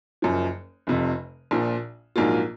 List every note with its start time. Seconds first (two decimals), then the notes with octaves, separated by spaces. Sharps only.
0.22 F#1 F#2 F3
0.87 F1 F2 C3
1.51 A#1 A#2 F3
2.16 A#1 G#2 F#3 A#3 F4